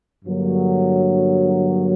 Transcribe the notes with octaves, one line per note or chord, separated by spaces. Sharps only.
G2 D3 F#3 A#3